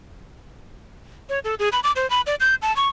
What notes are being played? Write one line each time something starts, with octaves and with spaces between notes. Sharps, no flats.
C#5
A4
G#4
B5
D6
C5
B5
D5
G6
A5
C#6